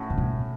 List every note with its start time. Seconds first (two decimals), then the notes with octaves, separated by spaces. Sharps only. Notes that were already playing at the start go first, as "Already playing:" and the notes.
Already playing: A2 C#4 F#4
0.10 C#3
0.18 B2